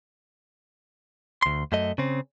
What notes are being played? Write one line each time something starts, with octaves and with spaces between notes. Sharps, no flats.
D2 C6
F#2 A3 D#5
C#3 C4